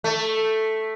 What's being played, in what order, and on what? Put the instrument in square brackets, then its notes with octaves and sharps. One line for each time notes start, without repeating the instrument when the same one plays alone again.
[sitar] A3